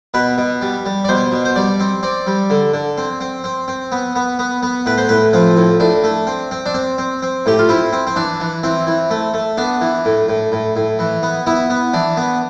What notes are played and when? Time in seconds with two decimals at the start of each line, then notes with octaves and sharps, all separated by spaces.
0.14 B2 B4
0.38 B2
0.62 G3
0.85 G3
1.05 D5
1.09 B2 C5
1.32 B2
1.45 C5
1.56 G3 D5
1.80 C4
2.03 C4 D5
2.27 G3
2.50 D3
2.74 D3
2.98 C4
3.21 C4
3.44 C4
3.68 C4
3.92 B3
4.15 B3
4.39 B3
4.63 B3
4.86 A2 B4
4.97 C5
5.09 A2 B4
5.33 F3 C4
5.57 A2
5.80 A2 D4
6.04 A3
6.27 C4
6.51 C4
6.66 D4
6.74 C4
6.98 C4
7.22 C4
7.46 A2 G4
7.59 F4
7.69 C4 E4
7.93 C4
8.07 C4
8.16 E3 D4
8.40 E3
8.63 E3 C4
8.87 E3
9.10 A3
9.34 A3
9.57 B3 D4
9.81 E3
10.05 A2
10.28 A2
10.52 A2
10.76 A2
10.99 E3
11.23 B3
11.46 B3 E4
11.70 B3
11.93 E3 D4
12.17 B3